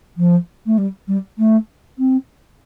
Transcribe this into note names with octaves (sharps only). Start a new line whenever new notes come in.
F3
A3
G3
G3
A3
C4